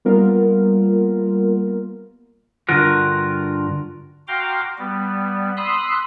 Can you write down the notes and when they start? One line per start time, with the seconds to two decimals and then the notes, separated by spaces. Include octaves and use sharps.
0.05 G3 A#3 B3 F4 A#4
2.69 G2 D3 F4 F#4 A#4
4.28 F#4 F5 G5 A#5 C6 D6
4.78 G3 B3
5.57 B5 C6 D#6 E6 F#6